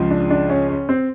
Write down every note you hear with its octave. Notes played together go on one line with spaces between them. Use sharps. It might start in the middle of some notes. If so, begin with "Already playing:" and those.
Already playing: C#2 C#3 F3
D4
D4
C#4
C#4
C4